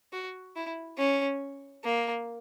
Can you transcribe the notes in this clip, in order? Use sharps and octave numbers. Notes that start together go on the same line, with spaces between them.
F#4
E4
C#4
A#3